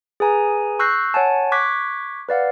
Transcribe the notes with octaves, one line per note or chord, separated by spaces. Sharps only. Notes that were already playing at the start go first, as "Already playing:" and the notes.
G#4 B4 G#5 A#5
C#6 E6 F#6 G6 A#6 C7
C#5 F#5 G#5 A5
C#6 D6 F#6 G#6 B6
B4 D5 F5 F#5